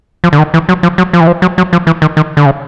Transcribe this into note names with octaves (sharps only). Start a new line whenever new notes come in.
F3
D3
D#3
E3
F#3
F3
F#3
F3
E3
F3
F#3
F#3
F3
E3
D#3
D#3
D3
C#3